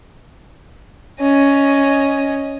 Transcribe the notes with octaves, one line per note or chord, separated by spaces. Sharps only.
C#4 D#5